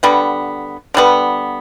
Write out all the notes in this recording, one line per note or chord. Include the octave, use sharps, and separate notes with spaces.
D3 G3 B3
D3 G3 B3